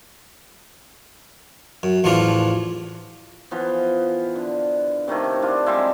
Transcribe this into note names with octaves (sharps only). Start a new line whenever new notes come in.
F#2
A1 E2 F3 D4 F4 F5
E3 F3 B3
D3
C3 D#3 A3 E4
D4 F4
G3 G#3 C4 E4